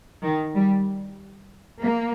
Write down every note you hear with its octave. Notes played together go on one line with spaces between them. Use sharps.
D#3
G3
A#3